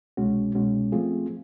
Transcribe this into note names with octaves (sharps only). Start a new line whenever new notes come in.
C2 B2 G#3 C#4 F#4
C2 B2 G#3 C#4 F#4
F3 A3 C4 F4 G#4